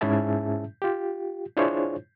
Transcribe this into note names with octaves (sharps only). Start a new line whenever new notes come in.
G#2 C#4 E4 G#4 E5 A5
F4 G4
D4 E4 F4 G#4 C5 C#5